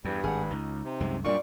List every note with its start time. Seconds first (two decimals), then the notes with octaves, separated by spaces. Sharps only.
0.05 E2 G2 G3
0.24 G#1 G#4 F#5
0.51 C#2 D#4
0.84 C3
1.00 C2 F#2 G#3
1.24 F#2 A#2 G3 A3 D4 F4 D5 C#6